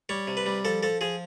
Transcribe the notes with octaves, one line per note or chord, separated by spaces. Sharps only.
G3 C#5
C3
B4
G3
F3 A4
F3 A4
F3 G#4